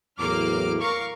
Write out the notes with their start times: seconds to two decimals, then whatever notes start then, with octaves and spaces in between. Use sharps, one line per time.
0.20 E2 A2 F#3 A#3 D6 F6
0.80 A#4 F5 C#6